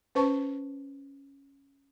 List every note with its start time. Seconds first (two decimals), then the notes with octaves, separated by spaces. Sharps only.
0.15 C#4 B4 C5 A5 C#6